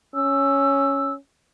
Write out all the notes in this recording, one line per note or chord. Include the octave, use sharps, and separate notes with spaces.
C#4 E6